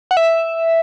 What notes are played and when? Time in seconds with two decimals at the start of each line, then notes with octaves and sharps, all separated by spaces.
0.11 F#5
0.17 E5